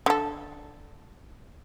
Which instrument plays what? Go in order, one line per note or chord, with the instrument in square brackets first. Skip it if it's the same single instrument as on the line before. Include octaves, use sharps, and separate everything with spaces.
[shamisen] D3 A4